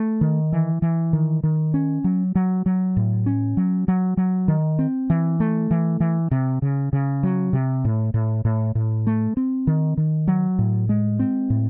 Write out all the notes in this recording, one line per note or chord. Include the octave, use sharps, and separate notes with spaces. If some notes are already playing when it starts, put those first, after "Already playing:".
Already playing: A3
D#3
E3
E3
D#3
D#3
C#4
F#3
F#3
F#3
A2
C#4
F#3
F#3
F#3
D#3
C4
E3
A3
E3
E3
C3
C#3
C#3
F#3
C3
A2
A2
A2
A2
A3
C4
D#3
D#3
F#3
A2
G#3
C4
A2